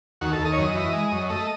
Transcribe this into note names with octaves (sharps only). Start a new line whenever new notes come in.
D#2 F#4
A4
D#2
D#5
C#5
F#2 D#5
E3
G#3
F#2
A3 D#5